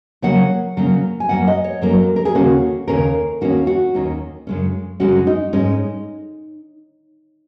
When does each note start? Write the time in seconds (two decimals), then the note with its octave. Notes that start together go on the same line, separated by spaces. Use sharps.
0.22 C#3 F#3 A#3 C#4 F#5
0.77 C#3 F#3 A#3 C#4
1.20 G#5
1.29 F#2 F#3 A#3 C#4 F#5
1.48 D#5
1.64 C#5
1.82 F#2 F#3 A#3 C#4 A#4
2.16 A#4
2.25 G#4
2.35 D#2 C#3 A#3 C#4 F#4
2.88 D#2 C#3 A#3 C#4 A#4
3.41 D#2 D#3 A#3 C#4 F#4
3.67 F#4
3.94 D#2 D#3 A#3 C#4
4.47 F#2 C#3 G#3 C#4
5.00 F#2 C#3 G#3 C#4 F#4
5.27 D#4
5.53 G#2 G#3 C#4